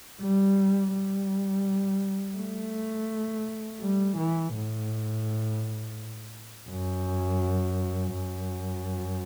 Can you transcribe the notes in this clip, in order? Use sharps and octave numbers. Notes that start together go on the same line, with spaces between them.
G3
G3
A3
G3
E3
A2
F#2
F#2